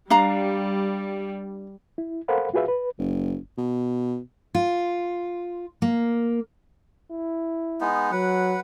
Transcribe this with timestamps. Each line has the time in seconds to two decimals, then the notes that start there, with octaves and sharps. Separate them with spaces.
0.10 G3 D4 F5 A#5
1.98 E4
2.28 A4 A#4 C5 F5 F#5 B5
2.54 F4 F#4 G#4 B4 E5 F5
2.68 B4
2.99 F#1
3.58 B2
4.55 F4
5.82 A#3
7.11 E4
7.81 G#3 B3 D#4
8.12 F#3 B4 F#5